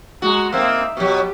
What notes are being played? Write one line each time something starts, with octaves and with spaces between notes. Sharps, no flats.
G#3 F#4 A#5
A#3 C4 D#4 E5
B2 F#3 G4